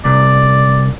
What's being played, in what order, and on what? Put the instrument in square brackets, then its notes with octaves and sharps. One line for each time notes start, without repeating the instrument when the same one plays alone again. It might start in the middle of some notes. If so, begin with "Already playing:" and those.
[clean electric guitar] C2 [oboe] D5